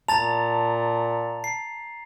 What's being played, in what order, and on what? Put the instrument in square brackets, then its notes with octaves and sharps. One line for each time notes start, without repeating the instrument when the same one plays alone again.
[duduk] A#2 [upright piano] A5 [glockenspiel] A#5 A6 F7
[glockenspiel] C7